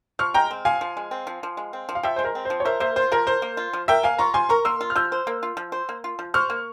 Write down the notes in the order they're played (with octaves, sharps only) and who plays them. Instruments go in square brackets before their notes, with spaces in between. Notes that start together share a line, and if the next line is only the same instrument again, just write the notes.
[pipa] F3 [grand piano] C#6 F6
[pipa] G#3 [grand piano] G5 A#5
[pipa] C4
[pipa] F3 [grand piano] F5 G#5
[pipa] F3
G#3
C4
F3
F3
G#3
C4
F3
[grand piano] F5
[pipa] F3 [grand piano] E5 G5
[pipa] G#3 [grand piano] C5
[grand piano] A#4
[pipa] C4
[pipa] F3 [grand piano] C5
[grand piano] C#5
[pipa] A#4 [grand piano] C5 E5
[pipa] A#3 [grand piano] C5 E5
[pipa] F4 [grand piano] C5
[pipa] F3 [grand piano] A#4
[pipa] A#4 [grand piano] C5
[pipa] A#3
F4
F3
[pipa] A#4 [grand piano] E5 G5
[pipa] A#3 [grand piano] F5 G#5
[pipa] F4 [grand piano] A#5 C#6
[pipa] F3 [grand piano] G#5 C6
[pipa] A#4 [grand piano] A#5 C#6
[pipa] A#3 [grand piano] C6 E6
[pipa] F4
[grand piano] F6
[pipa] F3 [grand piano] E6 G6
[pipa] C5
A#3
F4
F3
C5
A#3
F4
F3
[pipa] C5 [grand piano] C#6 F6
[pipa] A#3